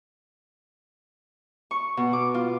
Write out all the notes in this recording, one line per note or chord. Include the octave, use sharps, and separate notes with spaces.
C#6
B2
D6
F4